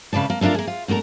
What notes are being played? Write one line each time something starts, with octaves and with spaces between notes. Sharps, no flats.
A2 C#3 B4 D5 A5
A#3
A3 A#3 D4 F4 A#4
A#3 G#4
F4
B2 A3 D4 A#4 A#5